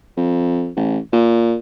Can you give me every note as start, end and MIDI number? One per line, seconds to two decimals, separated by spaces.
0.17 0.70 41
0.76 0.98 33
1.13 1.56 46